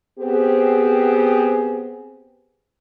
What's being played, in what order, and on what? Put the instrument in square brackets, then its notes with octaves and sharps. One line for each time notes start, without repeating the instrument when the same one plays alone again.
[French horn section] B3 C4 G4 G#4